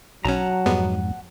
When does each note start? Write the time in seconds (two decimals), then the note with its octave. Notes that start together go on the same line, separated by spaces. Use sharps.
0.25 B1 F#3 C#4 F#5 A5 A#5
0.66 F2 G#2 G3 G#3 B3